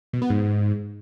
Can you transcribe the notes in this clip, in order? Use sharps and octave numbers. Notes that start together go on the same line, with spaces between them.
B2
B3
G#2